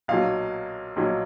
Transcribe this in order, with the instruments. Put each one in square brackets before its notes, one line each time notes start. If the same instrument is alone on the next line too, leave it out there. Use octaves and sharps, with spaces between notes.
[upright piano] B1 A#2 F#3 F5
B1 A#2 F#3